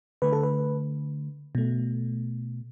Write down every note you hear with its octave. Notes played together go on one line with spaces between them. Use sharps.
D3 A3 B4
A4
B4
B2 A3